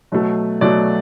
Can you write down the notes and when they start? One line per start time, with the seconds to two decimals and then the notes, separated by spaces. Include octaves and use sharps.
0.12 B2 F#3 A3
0.61 B2 F#3 A3 D5